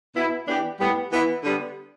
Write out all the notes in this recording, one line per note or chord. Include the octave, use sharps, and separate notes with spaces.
B2 B3 E4
E3 B3 D4 G4
A2 G3 B3
E3 B3 E4
D3 G3 B3